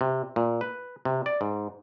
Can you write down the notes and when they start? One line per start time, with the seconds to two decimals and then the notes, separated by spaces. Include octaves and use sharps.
0.01 C3
0.36 A#2
0.61 B4
1.05 C3
1.26 D5
1.41 G#2